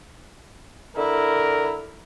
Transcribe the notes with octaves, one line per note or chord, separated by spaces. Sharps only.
D3 E4 A#4